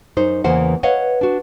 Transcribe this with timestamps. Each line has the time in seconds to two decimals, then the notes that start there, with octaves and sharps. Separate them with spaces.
0.17 F#2 D#4 C5
0.44 E2 C#3 E3 A#3 C5 F#5
0.83 B4 C#5 D#5 F5 F#5
1.21 D4 F#4